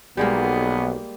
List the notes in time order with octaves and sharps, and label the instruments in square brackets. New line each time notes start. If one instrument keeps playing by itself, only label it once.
[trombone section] B1 [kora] G3 G#3 A#3 [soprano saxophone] B3